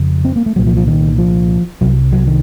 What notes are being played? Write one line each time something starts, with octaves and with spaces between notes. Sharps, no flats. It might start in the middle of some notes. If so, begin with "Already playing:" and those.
Already playing: F2 C#3
C4
A#3
A3
C2 A#2 F#3
F3
F3
D#3
F3
C2 C3 F#3
F#3
D#3